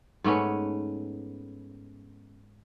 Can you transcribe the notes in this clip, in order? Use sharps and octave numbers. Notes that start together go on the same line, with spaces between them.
G#2 A3 B3 C#4